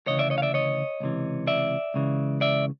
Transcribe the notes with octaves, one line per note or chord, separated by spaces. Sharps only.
D2 C#3 E3 C#5 D#5
D5 E5
C#5 D#5
F5
D5 E5
C#5 D#5
C#2 C3 E3
D5 E5
C#2 C#3 E3
D5 E5